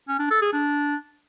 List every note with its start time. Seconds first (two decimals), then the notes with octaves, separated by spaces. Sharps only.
0.08 C#4
0.19 D4
0.30 A4
0.41 G#4
0.53 D4